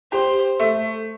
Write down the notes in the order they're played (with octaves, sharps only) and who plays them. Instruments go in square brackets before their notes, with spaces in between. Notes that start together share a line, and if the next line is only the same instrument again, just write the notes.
[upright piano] G4 [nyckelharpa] C5
[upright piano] A3